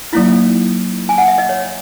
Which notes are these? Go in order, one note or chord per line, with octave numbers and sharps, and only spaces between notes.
F#3 A#3 D#4 E4
G#5
F#5
E5
D#5
C#5